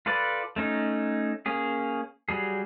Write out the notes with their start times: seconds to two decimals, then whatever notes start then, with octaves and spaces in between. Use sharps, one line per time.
0.06 F4 A4 B4 D5
0.56 A3 C#4 D#4
1.46 A#3 C#4 G#4
2.29 F#3 G3 G#4